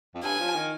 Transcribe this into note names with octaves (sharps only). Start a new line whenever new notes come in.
F2
G2 G#5
F3
D#3